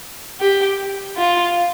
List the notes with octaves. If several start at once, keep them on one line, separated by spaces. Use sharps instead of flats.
G4
F4